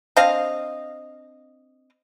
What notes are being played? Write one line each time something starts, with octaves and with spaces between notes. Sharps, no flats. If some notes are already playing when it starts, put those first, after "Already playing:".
C4 D4 D#5 F5